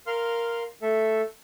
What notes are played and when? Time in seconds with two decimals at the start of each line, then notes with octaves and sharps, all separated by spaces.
0.07 A#4 F5 C6 F6
0.82 A3 A4 E5